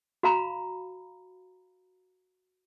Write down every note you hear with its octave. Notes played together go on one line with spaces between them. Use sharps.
F#4 F5 A#5 B5